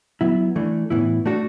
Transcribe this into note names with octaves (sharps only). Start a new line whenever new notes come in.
F#3 B3 E4
E3 A3 D4
A2 E3 B3 E4
A3 D4 F#4 A4